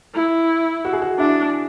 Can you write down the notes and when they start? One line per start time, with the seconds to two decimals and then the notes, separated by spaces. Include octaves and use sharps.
0.14 E4
0.85 F#4
0.93 G#4
1.02 F#4
1.19 D4 E4